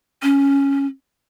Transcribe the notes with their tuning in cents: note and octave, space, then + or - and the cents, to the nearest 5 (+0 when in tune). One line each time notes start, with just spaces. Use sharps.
C#4 +0